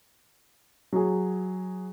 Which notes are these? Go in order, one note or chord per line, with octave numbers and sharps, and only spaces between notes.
F#3 G#4